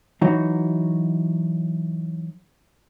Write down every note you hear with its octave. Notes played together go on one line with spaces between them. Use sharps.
E3 F#3 D#4 F#4